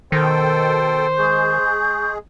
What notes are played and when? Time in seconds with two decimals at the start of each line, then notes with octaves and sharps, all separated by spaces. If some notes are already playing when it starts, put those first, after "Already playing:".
0.12 B2 D#3 A4 C5 G5
1.18 G#3 G#4 C#6 G6